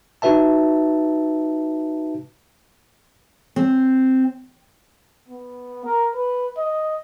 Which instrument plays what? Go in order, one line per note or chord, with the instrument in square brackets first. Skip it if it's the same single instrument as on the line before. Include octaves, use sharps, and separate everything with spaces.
[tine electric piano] D#4 F#4 B4 E5 A5
[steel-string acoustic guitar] C4
[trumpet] B3
A#4
B4
D#5